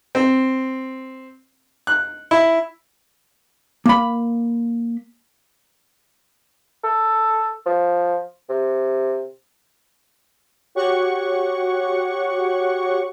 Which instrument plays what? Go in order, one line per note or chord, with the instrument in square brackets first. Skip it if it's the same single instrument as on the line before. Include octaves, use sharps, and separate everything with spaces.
[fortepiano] C4
F#6
E4
[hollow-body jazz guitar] A#3 B5
[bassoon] A4
F3
C3
[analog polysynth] F#4 G4 C#5 F#5 C#6